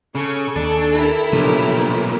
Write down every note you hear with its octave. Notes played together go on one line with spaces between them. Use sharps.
C#3 A4 G#5 C#6
D#2 D4
E4 G4 A#4
B1 A#2 C#3 F3 D4